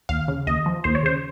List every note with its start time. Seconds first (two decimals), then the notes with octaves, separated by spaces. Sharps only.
0.09 D#2 F5
0.28 C#3
0.47 D#2 D#5
0.66 F3
0.84 D#2 C5
0.95 C#5
1.03 C#3 C5